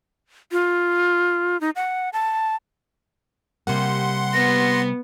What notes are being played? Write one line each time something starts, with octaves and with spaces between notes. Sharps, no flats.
F4
D#4
F#5
A5
C3 G3 A#3 F#5 C6
B3 A#6